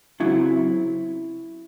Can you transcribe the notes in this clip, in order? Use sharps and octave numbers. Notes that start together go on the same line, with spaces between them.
C#3 F#3 C4 E4